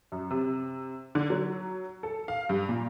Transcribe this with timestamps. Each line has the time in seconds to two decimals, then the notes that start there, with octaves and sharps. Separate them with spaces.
0.12 F#2
0.31 C3
1.15 D3
1.30 F#3
2.03 A4
2.28 F5
2.49 G2
2.69 A#2